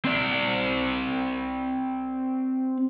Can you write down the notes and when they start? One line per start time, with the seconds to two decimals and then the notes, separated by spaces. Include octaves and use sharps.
0.05 C4 D5